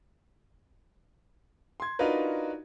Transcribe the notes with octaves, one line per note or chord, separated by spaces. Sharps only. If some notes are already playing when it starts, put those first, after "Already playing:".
C6 G#6
D4 D#4 F4 F#4 A#4 B4